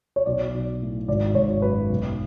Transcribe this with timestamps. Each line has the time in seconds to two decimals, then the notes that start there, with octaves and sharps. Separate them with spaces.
0.16 C#5
0.26 B1 D5
0.54 B1
0.81 A2
1.08 G#1 D5
1.35 G#1 C#5
1.62 F#2 B4
1.90 B1